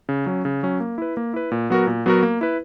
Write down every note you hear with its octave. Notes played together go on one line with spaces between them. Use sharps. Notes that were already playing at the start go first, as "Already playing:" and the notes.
C#3
F#3 C#4
C#3
F#3 C#4
A#3
E4 B4
A#3
E4 B4
A#2
F#3 B3 F#4 A#4
A#2
F#3 B3 F#4 A#4
A#3
E4 B4